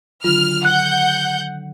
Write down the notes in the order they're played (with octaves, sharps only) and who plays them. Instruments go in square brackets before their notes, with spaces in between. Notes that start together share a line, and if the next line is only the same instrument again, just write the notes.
[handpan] D3 D#3 F#3 [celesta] F4 [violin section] F6
[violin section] F#5 G6 [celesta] F#6